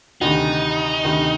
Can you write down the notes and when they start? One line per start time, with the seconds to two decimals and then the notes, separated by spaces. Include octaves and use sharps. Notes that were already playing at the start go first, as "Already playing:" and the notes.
0.21 D2 C3 D#3 D#4
1.05 D2 C3 D#3